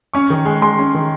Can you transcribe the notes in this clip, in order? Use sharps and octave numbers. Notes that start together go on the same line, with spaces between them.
C#4 C#6
D#3
G#3
G#3 C6
C#4
D#3